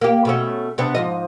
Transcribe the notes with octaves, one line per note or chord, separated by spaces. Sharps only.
A#3 G4
B2 A3 C#4
C3 B3 D4
G#2 F3 D#5